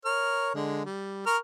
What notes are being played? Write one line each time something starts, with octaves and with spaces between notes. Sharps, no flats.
A#4 C#5 F6
D3 G#3
G3
A#4 C#6 F6